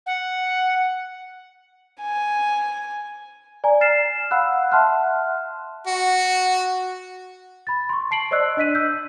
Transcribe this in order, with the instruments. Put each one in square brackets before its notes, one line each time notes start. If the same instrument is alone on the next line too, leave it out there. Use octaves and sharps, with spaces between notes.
[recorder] F#5
[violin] G#5
[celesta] D5 G#5 A#5
F6 A6 C7 E7
F5 F#5 B5 E6 F#6
E5 F#5 A5 C6 F6 F#6
[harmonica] F#4
[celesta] B5 A6
C6 C#6
A5 C7 D7 F#7
C5 D5 D#5 E6 F#6
D4 D#5 B6 D#7
E6 G6